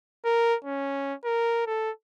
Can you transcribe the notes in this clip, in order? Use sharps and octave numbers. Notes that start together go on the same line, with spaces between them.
A#4
C#4
A#4
A4